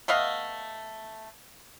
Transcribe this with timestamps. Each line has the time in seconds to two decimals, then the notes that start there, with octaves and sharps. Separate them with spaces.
0.08 A3 B3 D#5 F5